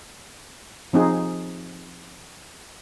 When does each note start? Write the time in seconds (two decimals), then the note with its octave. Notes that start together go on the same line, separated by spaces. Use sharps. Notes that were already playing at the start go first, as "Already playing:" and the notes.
0.93 F3 C4 D#4 G#4